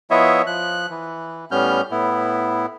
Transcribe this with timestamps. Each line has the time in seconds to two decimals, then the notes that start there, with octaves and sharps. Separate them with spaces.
0.11 F3 B3 E4 C#5 D#5 E5
0.47 F3 F#6
0.90 E3
1.51 A2 G3 B3 C#4 F6 G6
1.91 A2 B3 E4